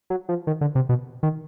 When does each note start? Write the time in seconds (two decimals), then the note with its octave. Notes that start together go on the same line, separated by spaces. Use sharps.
0.10 F#3
0.29 F3
0.47 D#3
0.61 D3
0.75 C3
0.89 B2
1.23 D#3